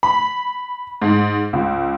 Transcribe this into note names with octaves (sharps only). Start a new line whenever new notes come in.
B5
G#2
C#2